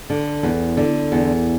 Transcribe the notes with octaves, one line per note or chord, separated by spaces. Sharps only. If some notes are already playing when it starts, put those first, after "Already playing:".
D3
E2
D3
E2